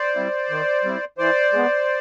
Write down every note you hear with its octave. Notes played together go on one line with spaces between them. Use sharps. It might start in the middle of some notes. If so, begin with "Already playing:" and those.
Already playing: C5 D5
G3 C4 E4
D#3
G3 C4 E4
E3 C5 D5
G#3 B3